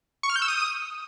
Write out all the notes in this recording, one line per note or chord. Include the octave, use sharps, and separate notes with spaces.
C#6
F6
G6
E6
D#6